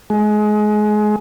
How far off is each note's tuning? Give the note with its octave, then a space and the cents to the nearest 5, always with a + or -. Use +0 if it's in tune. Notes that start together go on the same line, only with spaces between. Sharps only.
G#3 +25